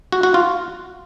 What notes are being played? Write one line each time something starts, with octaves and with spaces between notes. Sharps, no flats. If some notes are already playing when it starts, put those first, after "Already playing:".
F#4
F#4
F4